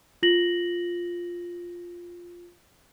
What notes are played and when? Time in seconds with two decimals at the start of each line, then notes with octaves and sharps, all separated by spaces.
0.23 F4 A#6 F#7